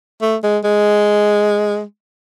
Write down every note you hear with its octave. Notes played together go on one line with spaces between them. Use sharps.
A3
G#3
G#3